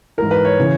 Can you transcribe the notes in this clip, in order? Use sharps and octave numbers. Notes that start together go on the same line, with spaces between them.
G#2 E3 A#4
B4
C#5
C#3 E3